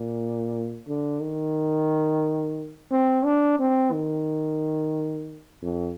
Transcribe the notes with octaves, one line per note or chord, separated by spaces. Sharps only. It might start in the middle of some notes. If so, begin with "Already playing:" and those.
Already playing: A#2
D3
D#3
C4
D4
C4
D#3
F2